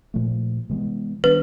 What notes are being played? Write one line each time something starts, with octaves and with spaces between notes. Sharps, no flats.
A#2 F3 A3
C3 E3 G#3 B3
D#3 G3 B3 D4 B4